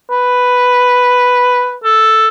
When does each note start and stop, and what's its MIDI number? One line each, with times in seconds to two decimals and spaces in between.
0.10 1.77 71
1.84 2.28 69